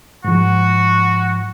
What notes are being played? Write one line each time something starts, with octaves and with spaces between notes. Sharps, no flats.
G#2 F3 F#4